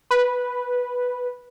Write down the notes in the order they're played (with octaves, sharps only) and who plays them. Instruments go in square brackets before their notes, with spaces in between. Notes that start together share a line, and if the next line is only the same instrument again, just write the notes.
[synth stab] B4